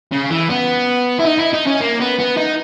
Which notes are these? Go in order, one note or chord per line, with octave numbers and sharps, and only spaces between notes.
C#3
E3
B3
E4
D#4
E4
D#4
C#4
A#3
B3
B3
D#4